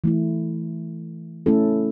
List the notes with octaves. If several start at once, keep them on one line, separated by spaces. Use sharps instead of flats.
E3 A3 E4
A3 C#4 E4 A4